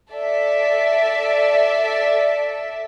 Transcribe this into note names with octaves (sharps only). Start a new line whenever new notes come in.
A4 D5 E5